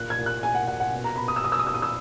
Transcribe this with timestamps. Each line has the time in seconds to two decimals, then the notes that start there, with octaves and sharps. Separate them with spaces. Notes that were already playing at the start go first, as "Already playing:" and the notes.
Already playing: A#2 F#6
0.10 G#6
0.18 A#2
0.26 F#6
0.42 A#2 G#5
0.55 F#5
0.67 A#2 F#5
0.80 F#5
0.92 B2
1.04 A#5
1.16 B2 B5
1.28 D#6
1.36 E6
1.40 B2 D#6
1.52 E6
1.59 D#6
1.65 B2 E6
1.74 D#6
1.82 E6